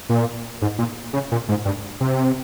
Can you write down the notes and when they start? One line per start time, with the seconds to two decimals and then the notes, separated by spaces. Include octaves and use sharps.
0.09 A#2
0.62 G#2
0.78 A#2
1.13 C#3
1.32 A#2
1.49 G#2
1.65 G2
2.00 C3